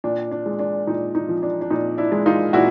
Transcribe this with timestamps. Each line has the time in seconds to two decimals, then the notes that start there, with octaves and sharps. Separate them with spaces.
0.04 A#2 D4
0.31 D4
0.46 G#3
0.59 D4
0.87 A#2 D#4
1.15 D#4
1.29 F3
1.43 D4
1.61 D4
1.70 A#2 D#4
1.98 D4 E4
2.12 G#3
2.26 D#4 F4
2.53 A#2 E4 F#4